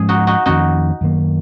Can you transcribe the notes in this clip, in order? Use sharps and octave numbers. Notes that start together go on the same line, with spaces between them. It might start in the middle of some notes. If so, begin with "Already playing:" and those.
Already playing: G#2 F3 G#3 C#4 G#4
D#4 F#4
D#4 F#4
F2 D#3 A#3 C#4 D#4 F#4
F#2 D#3 A#3